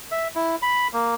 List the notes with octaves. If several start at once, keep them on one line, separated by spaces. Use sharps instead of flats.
E5
E4
B5
A#3